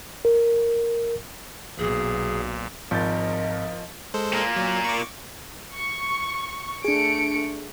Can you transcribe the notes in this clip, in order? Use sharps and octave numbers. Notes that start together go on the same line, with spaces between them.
A#4
B1 A#2 G#4
G#1 F3 A#4 D#5 G6 A6
G#3 A4 C5
A#2 A#3
F#3
C#6 D6
C#6
A3 D4 G#4 C#7 D7